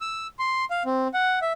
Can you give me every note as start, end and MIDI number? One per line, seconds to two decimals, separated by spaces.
0.01 0.27 88
0.39 0.65 84
0.71 0.83 77
0.86 1.08 60
1.14 1.39 78
1.42 1.53 76